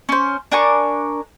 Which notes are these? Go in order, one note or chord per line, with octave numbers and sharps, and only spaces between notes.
C#4 C5
D4 A#4 G#5 C#6